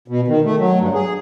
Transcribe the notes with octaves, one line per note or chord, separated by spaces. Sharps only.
B2
D#3
A3
F#3
G2
G#4